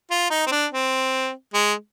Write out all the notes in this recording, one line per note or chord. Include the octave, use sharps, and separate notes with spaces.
F4
D#4
C4
D4
C4
G#3